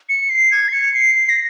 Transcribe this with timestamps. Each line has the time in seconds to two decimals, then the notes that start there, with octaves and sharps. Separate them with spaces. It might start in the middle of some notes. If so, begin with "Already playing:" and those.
0.09 C#7
0.30 C7
0.51 G#6
0.69 C7
0.73 C#7
0.94 C7
1.15 C7
1.29 A#6